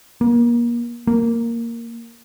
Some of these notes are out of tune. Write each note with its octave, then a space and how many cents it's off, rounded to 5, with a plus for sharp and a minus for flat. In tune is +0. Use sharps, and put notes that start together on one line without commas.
A#3 +30
A#3 -5